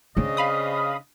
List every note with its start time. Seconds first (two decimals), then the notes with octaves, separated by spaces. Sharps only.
0.17 C#3 C4 D4 D5 D#5
0.37 F5 B5 D#6